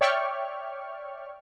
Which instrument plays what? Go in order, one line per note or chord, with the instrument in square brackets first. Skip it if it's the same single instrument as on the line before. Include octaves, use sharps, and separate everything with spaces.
[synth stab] C#5 D5 E5 G5 C#6 F6